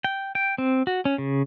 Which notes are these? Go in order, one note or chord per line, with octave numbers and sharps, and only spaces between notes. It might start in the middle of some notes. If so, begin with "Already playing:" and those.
G5
G5
C4
F#4
C#4
C#3